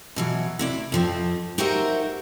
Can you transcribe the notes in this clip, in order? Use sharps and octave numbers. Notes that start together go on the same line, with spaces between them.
B2 E3 F#3
C3 E4 D5
F2 F3 C4
D#4 F#4 G4 A#4 C5 E5